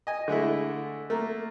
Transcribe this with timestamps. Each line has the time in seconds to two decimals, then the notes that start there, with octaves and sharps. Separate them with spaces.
0.07 D#5 G#5
0.28 D3 G#3 A3 E4
1.10 A3 A#3